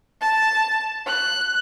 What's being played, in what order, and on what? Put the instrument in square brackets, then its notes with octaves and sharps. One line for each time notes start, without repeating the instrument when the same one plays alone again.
[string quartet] A5
F#6